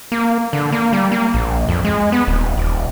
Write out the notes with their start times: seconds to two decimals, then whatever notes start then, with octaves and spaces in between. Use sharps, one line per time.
0.12 A#3
0.53 D3
0.72 A#3
0.93 G3
1.12 A#3
1.34 A#1
1.69 F2
1.84 G#3
2.12 B3
2.28 D#1
2.58 D#1